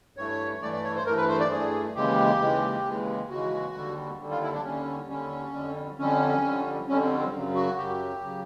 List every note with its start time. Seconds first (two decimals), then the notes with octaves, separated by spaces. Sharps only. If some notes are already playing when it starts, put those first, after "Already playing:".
0.17 G2 E3 A3 C#5
0.61 G2 E3 A3 D5
0.73 D5
0.84 C#5
0.95 C5
1.06 G2 E3 A3 A#4
1.17 B4
1.29 C5
1.40 D5
1.51 G2 E3 A3 G#4
1.95 D#2 C#3 E3 G#3 G4
2.40 D#2 C#3 E3 G#3
2.85 D#2 C#3 E3 G#3
3.30 D#2 C#3 E3 G#3 F#4
3.75 D#2 D3 G3
4.19 D#2 D3 G3
4.31 F4
4.42 E4
4.53 D4
4.64 D#2 D3 G3 C#4
5.08 D#2 D3 G3 C#4
5.53 F2 D3 G3
5.98 F2 D3 G3 C#4
6.43 F2 D3 G3
6.88 F2 D3 G3 C#4
7.03 C4
7.18 C4
7.32 F#2 C#3 F#3
7.55 F#4
7.77 F#2 C#3 F#3 G4
8.23 C#3 F#3